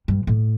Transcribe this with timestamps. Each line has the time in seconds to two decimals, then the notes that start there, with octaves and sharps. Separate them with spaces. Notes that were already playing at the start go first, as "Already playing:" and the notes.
0.08 G2
0.27 A2